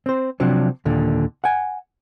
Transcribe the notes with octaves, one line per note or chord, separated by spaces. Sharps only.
C4 C5
C3 F3 F#3 D4
D#2 A#2 D3
F#5 G#5